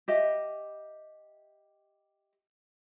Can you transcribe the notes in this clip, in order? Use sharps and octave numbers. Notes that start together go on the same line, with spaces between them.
G4 D#5 E5